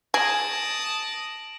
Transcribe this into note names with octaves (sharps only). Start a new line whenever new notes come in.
G#4 A5 D#6 A#6 D7 F#7